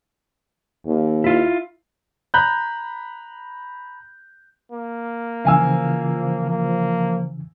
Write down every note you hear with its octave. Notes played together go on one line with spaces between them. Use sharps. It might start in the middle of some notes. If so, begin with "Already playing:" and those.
D#2
E4 F4
A#5 B5 F#6 G6
A#3
C#3 E3 F3 F5 G#5 E6
A#3